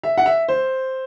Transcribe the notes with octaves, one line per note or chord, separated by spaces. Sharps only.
E5
F#5
E5
C5